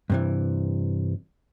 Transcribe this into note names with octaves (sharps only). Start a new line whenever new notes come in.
G2 C3 E3